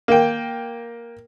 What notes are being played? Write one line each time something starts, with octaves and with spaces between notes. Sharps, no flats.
A#3 G5